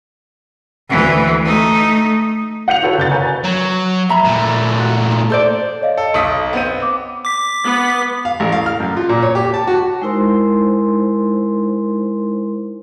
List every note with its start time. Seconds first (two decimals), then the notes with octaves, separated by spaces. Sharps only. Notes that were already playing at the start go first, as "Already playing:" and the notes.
0.90 D2 E3
1.44 A3 D#4
2.68 F#5 G6 C#7 F7
2.82 F4 F#4 A4 B4 C#5
2.98 F#1 G6 A6
3.11 A#4 B4 C#5 G#5 A#5
3.44 F#3
4.09 E5 A#5 B5
4.25 A#2 A3
4.79 F#4
5.11 D#4
5.30 A4 C5 D5
5.81 C#5 D#5 F5
5.97 A4
6.14 B1 D#6 B6
6.53 B3 C4 D#7
6.82 D6
7.25 D6 B6
7.64 B3
8.25 F5
8.40 A1
8.52 F5
8.66 F6
8.80 F#2
8.97 F4
9.09 A#2
9.22 C#5
9.35 G4
9.54 A5
9.67 F#4
10.02 G#3 D#4 E4 A#4 C5 C6